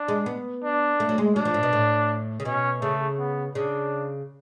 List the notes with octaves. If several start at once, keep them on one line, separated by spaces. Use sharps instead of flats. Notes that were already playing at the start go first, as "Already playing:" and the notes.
Already playing: D4
G#3
B3
D4
A3
F#3
G#3
F#3 D4
F3
A2
B2
A2
C#3
B2 C#4
C#3 A3
B3
C#3 D4